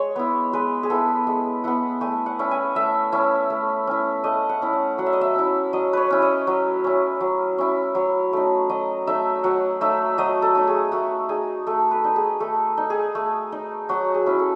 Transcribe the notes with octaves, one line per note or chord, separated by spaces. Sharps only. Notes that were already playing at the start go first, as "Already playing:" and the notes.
Already playing: G#3 C#5
B3 E4
G#3 B4
G#4
B3 E4 A4
G#3
B3 E4 F#5
A3 G#5
F#5
C#4 E4
G#5
A3 E5
C#4 E4
A3
C#4 E4
A3 D#5
F#5
C#4 E4
F#5
F#3 F#5
E5
D#5
E5
C#4 E4
F#3 D#5
B4 C#5
C#4 E4
D#5
F#3
C#4 E4
F#3
C#4 E4
F#3 C#5
A3 D#4
F#3 D#5
A3 D#4 E5
F#3 F#5
A3 D#4 E5
F#3 D#5
A4
A3 D#4
G#4
A3 F#4
D#4 G#4
A3 A4
B4
D#4
G#4
A3 A4
D#4
G#4
A3
D#4
F#3 F#4
G#4
C#4 E4
A4